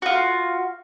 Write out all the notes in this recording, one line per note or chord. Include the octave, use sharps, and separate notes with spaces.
F4 F#4